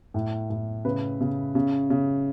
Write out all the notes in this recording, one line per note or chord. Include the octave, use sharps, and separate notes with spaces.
A2
A2
C#3 B4
C#3
C#3
C#3